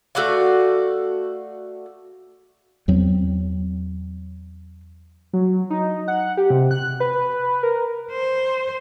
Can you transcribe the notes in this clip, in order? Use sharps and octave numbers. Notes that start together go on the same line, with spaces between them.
A3 F#4 D5 F5
E2 F#3 C4
F#3
D#4
F#5
G4
C3
F#6
B4
A#4
C5